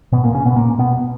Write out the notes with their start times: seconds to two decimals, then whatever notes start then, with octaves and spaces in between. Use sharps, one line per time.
0.12 B2 B3
0.23 A#2 A#3
0.34 C#3 C#4
0.45 B2 B3
0.56 A#2 A#3
0.79 B2 B3